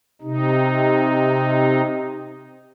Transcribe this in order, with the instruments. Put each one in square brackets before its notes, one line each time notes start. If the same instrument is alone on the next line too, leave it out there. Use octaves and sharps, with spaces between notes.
[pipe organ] C3 D#4